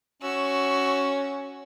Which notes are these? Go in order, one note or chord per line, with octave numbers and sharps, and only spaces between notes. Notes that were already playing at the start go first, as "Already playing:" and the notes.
C#4 F#4 E6